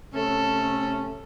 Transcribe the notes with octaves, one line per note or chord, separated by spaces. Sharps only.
C3 A3 C#4 A4